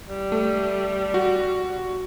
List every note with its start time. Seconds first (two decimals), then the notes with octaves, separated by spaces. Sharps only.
0.07 G3
0.32 A3
1.14 F#4